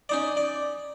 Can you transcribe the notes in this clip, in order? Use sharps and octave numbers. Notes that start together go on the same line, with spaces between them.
C#4 D#4 D5
D5